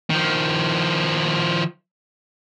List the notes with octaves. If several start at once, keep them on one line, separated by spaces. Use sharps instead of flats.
D#3 F3